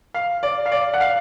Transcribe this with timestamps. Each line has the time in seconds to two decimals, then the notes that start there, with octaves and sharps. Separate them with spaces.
0.14 F5
0.43 D5
0.66 F5
0.72 D5
0.94 F#5
1.01 F5